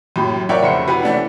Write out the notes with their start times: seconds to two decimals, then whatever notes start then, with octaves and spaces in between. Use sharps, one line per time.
0.16 F#2 A2 G4
0.49 A#4 C#5 D5 E5 F#5 G5
0.62 F1 C#3 C5 C#7
0.87 C3 E4 F#4 B4
1.02 E3 A3 C#4 D4